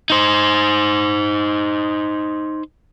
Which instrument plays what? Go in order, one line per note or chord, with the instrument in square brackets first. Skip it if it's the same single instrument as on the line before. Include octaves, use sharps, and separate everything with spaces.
[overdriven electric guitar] D#4 C5